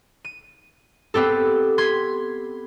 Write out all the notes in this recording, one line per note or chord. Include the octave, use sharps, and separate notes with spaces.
D#7
B3 C4 G4 A4
C6 G#6 B6